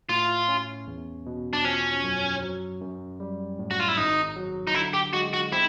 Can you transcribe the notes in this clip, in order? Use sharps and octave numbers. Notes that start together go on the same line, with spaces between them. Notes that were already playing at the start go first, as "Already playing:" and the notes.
A2 F4
C#4
E2
B2
D4
F3 C#4
F#2
F#3
F#2
G3
A2
F#4
F4
E4
G#1 D#4
F#3
D#4
D3 E4
G4
G#3 F#4
F#4
C4 E4